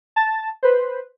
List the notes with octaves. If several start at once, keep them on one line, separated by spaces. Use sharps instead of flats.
A5 A6
B4 C5